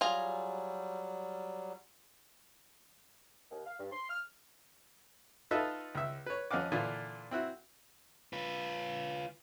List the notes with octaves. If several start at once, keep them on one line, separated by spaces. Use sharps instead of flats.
F#3 G3 F4 G#4 A#5
D#2
F5
G2
C6
F6
D#4 F4 A4 B4 D#5 E5
C#2 E5
B4 C#5
F2 C#4 D#5 F5 F#5 D6
A#2 D3 E3 F4
C4 E4 F#4
F4 B4